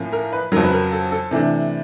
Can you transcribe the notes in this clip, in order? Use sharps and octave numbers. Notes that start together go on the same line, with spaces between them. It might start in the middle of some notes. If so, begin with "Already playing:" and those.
Already playing: A2 F3 A#3 C#4
A#4
B4
F2 C#3 F#3 A#4
B4
A#4
A4
A4
C3 E3 A3 D4